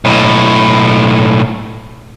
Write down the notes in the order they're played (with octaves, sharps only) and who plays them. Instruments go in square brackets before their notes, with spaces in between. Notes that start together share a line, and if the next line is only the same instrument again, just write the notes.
[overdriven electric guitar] B1 A2